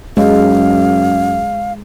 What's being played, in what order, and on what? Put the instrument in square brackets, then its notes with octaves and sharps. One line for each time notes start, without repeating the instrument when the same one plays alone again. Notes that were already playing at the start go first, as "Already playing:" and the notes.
[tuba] F#2 [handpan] G#3 [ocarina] F5